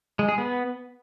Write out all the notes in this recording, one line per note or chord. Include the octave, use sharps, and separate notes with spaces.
G#3
G#4
B3